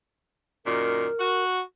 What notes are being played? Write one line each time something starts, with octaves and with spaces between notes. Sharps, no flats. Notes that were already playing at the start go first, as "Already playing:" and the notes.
F#2 A#2 D#3 A#4
F#4